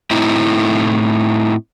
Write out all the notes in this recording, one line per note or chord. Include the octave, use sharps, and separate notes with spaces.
A2 C4 D#4 E4